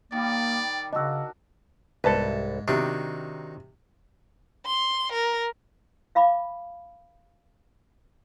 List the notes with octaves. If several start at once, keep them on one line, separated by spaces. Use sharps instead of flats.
D#3 G3 A#3 D5
C#3 D4 F#4 A#4 D#5 E6
C2 G#2 A4 B4 A5
C3 D#3 D4 D#4 F#4
C6
A#4
E5 F5 B5 D6